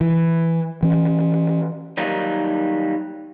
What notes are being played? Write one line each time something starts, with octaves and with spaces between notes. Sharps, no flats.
E3
E3 C#4
D#3 F#3 G3 A#3 D#4